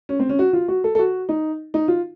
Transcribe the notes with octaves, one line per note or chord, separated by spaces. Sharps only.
C#4
C4
C#4
F#4
F4
F#4
A4
A4
F#4
D#4
D#4
F4